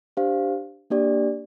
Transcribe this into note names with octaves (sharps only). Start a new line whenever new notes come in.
D4 G4 C5 F5
A#3 D4 G4 D5